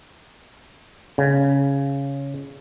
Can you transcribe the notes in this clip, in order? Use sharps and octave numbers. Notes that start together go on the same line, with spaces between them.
C#3